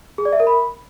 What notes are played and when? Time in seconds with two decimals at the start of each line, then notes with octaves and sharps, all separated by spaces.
0.18 G#4
0.25 D5
0.33 E5
0.40 A#4
0.47 B5